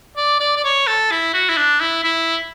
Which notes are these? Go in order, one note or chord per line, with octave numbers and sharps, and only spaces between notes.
D5
D5
D5
C#5
A4
E4
F#4
E4
D4
E4
E4